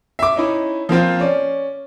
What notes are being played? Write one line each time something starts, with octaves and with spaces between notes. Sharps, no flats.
E5 D6
C#4 D#4 E4
F3 A#3 C4 F4
C#4 D5